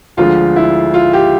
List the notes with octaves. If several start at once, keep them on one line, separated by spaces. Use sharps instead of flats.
D2 D3 F3 G#3 F4
E4
F4
G4